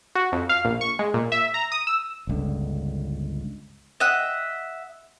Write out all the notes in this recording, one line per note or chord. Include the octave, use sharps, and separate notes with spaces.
F#4
F2
F5
A#1
C#6
G#3
A#2
E5
A#5
D#6
E6
G1 C#2 D3
D#5 E5 F#5